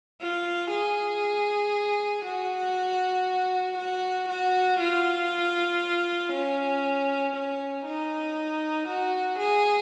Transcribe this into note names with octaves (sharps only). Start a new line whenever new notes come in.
F4
G#4
F#4
F#4
F#4
F4
C#4
C#4
D#4
F#4
G#4